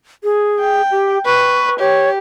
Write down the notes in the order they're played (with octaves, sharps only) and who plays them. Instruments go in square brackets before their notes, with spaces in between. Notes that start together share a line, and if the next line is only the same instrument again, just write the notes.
[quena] G#4
[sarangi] G5
[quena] G4
[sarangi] B4 [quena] C#6
[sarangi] G4 [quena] C#5